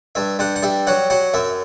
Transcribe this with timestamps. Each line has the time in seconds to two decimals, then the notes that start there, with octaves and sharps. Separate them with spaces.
0.15 G2 E5
0.39 G2 F#5
0.56 F#5
0.63 G3 E5
0.87 F#3 F#5
1.10 F#3 F#5
1.34 F#2 E5